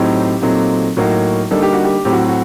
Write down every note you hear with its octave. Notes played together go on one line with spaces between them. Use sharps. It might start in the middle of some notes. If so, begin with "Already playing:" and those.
Already playing: A2 F#3 C4 D#4 G4
A#2 F#3 A3 C4 D#4
A2 F#3 A#3 D#4 F#4
D3 G3 A#3 D#4 A4
G4
F#4
G4
A2 F#3 C4 G4
F#4
F#4